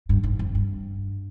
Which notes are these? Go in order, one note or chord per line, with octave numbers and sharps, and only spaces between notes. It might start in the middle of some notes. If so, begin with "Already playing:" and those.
G2
G#2
F2
G2